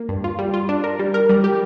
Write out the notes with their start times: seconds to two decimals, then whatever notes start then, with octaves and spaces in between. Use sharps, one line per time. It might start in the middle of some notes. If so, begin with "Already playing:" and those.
Already playing: A#3
0.09 G2
0.24 F4
0.39 G3
0.54 F4
0.69 D4
0.84 A#4
0.99 G3
1.14 A#4
1.29 G3
1.44 G4